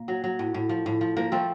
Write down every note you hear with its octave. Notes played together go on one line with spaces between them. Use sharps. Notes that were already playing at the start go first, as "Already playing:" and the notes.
Already playing: A#2 A#3
F#3
F#3
A2
A2
F3
A2
F3
F3 A#3
F3 A3 C4